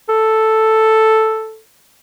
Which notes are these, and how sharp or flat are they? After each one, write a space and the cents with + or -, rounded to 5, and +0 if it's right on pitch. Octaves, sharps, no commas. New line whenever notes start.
A4 +0